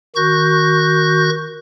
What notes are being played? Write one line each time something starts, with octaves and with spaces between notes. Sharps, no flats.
D#3 F#4 C#6 F#6 G6 A#6